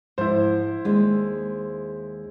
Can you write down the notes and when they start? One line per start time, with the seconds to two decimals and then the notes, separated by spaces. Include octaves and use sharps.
0.18 G#2 F3 E4 C5
0.85 D#2 G#3 D4